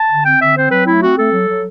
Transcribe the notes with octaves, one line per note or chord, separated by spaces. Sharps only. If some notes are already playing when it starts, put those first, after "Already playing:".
Already playing: A5
D3
C4 G5
D3 E5
C4 C5
F#3 B4
A3 E4
C4 F#4
A3 A4
F#3
F#3